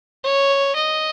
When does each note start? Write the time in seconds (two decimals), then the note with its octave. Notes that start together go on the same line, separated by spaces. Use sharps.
0.24 C#5
0.76 D#5